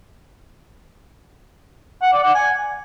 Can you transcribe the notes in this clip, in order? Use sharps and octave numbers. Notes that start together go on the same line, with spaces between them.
F#5
D5
F#5
G#5